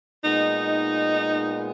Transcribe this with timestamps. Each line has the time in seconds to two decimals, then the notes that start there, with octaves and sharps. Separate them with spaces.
0.23 A#2 G#3 B3 D#4